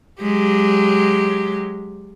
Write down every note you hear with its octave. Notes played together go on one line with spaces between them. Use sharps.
F#3 G#3 G4